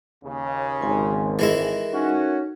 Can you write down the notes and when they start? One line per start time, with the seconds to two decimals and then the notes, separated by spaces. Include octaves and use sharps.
0.24 D#2 C#3
0.81 G#1 G#5 C6
1.39 E3 G#3 E4 A4 A#4 E5
1.92 C#4 D#4 F#4